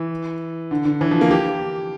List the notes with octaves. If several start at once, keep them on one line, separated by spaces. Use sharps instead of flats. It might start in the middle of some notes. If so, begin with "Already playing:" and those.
Already playing: E3
D3
D3
E3
F3
A#3
G4